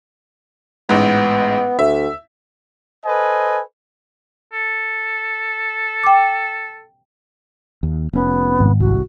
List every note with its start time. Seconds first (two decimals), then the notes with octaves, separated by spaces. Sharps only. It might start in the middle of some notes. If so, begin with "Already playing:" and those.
0.89 A1 G#2 B3
1.79 D2 E5
3.06 A4 B4 C5 D#5 G#5
4.53 A4
6.03 G5 D6
7.83 D#2
8.13 F1 B3 C#4
8.60 G#1
8.80 C2 F#4